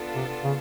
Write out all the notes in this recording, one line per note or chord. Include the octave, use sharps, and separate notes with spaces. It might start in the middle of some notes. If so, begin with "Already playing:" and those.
Already playing: B3 D4 F4 A4
C3
C#3